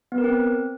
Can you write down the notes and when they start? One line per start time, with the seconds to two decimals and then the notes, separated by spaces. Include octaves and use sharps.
0.12 B3
0.18 A#4
0.24 C4